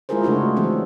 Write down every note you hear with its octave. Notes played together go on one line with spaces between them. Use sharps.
G#3 E4 F4 G#4 A#4 C5
C#3 A3 D4 F#4 G#4
E3 F#3 C4 D4 A4